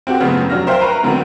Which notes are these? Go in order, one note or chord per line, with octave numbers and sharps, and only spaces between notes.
C4 F#4 G4 A4
F#2 A2 C#3 F3 B3 C4
F1 F#3 D4 F6 A#6
A#4 C5 E5 F5 G5 C6
A#4 B4 A#5 C#6
G#2 D3 F#3 B3 C4